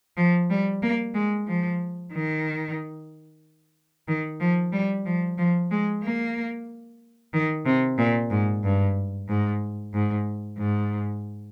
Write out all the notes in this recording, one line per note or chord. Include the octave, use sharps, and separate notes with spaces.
F3
G3
A#3
G#3
F3
D#3
D#3
F3
G3
F3
F3
G#3
A#3
D#3
C3
A#2
G#2
G2
G#2
G#2
G#2